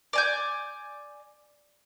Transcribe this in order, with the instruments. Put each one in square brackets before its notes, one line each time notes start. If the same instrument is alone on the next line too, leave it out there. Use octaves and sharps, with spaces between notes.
[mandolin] D5 G#5 G6